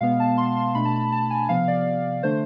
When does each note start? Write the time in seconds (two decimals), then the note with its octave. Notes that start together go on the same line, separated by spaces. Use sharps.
0.01 B2 G#3 B3 F5
0.20 A5
0.38 C6
0.56 C6
0.75 B2 A3 D4 B5
0.85 A5
0.96 B5
1.12 A5
1.30 G#5
1.49 C3 F3 B3 F5
1.68 D5
2.23 D3 A3 D4 C5